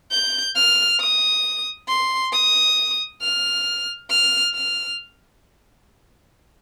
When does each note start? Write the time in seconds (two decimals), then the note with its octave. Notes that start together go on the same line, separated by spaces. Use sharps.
0.11 G6
0.56 F6
1.00 D#6
1.88 C6
2.33 D#6
3.21 F6
4.10 F6
4.54 F6